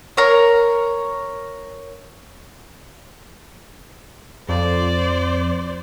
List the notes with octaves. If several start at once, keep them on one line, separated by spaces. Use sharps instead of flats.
A#4 C#5
F2 C5 D5